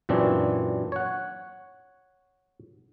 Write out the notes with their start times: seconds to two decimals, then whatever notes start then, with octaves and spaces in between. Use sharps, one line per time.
0.09 F#2 A#2 E3 C4 D4
0.92 C#5 F#5